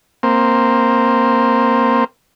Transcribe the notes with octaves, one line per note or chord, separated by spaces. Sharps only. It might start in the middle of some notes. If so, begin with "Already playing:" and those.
A#3 C4